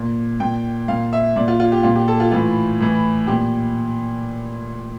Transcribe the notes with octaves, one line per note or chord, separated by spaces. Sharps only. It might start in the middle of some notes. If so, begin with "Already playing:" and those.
Already playing: A#2
A#2 G5
A#2 F5
E5
A#2 D5
F4
F4
G4
A#2 F4
G4
A4
F4
A2 E3 F4
A2 E3
A#2 G4